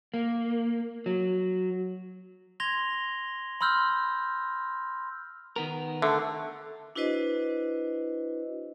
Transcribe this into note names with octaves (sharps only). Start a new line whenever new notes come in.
A#3
F#3
C6 G#6 A#6 F7 G7
B5 C6 E6 F6 G6
D#3 B3 A#4
D3 A3
D4 E4 F#4 B4 C5 D#5